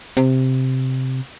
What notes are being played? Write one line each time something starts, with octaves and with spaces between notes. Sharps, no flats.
C3